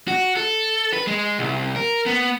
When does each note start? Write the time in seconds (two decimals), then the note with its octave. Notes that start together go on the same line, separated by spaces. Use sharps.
0.08 F#4
0.36 A4
0.93 B4
1.07 G#3
1.39 C2
1.76 A#4
2.06 B3